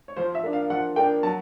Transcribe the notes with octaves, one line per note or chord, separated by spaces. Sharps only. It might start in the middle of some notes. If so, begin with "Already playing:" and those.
C#5
F3 C5
E5
A#3 D4
F5
F3 F#5
A#3 D4 G5
F#3 A5